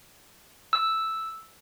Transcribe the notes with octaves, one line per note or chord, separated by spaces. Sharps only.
E6